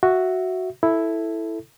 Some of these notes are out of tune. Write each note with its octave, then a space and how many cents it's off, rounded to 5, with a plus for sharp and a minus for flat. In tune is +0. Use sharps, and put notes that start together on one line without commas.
F#4 +0 E5 +0
E4 +0 A4 +0